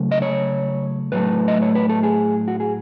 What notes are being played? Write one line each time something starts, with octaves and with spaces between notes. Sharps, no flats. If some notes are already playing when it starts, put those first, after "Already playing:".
Already playing: C#3 F#3 A3
D#5
C#5
A2 F#3 A3 B4
D#5
C#5
B4
A4
G#4
F#4
G#4